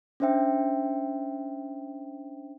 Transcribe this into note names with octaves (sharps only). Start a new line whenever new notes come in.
C#4 D4 C5 E5 G5